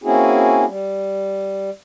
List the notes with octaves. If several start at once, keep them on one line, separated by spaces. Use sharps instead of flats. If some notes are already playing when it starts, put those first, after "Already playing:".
A#3 C4 C#4 E4 F#4 G#4
G3